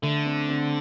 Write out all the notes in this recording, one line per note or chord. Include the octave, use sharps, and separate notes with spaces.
D3 A3
C4
C4